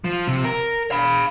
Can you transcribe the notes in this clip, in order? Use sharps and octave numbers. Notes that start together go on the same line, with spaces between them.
F3
C3
A#4
F5 B5